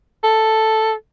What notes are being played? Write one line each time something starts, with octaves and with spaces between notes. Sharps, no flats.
A4